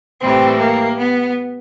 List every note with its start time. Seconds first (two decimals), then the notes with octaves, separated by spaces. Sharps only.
0.21 A2 E3 G3 C4
0.58 A#3
0.97 B3